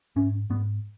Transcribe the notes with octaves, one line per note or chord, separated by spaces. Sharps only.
G#2 C#4
G#2 B3